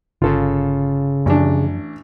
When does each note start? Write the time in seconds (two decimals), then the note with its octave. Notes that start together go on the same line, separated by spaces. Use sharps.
0.22 G1 C#3 F4 A4
1.26 A1 F#2 F3 D4